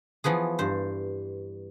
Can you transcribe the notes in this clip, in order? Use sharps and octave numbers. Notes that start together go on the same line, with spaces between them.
E3 F3 B3 G#4
G2 C5